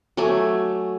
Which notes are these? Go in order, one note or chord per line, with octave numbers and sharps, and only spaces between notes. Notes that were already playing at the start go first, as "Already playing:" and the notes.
F#3 A3 G#5 D6